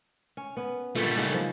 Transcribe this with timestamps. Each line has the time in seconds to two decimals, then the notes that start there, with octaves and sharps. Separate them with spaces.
0.37 C#4
0.57 B3 C#4
0.95 A#2 D3 G3 A3 D4
1.16 C#3 G#3 D#4
1.34 F3